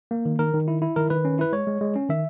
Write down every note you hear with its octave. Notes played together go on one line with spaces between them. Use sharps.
A#3
D#3
D#3 A#4
D#3
E4
E4
D#3 A#4
D#3 B4
C#4
E4 B4
G#3 C#5
G#3
G#3
C#4
D#3 E5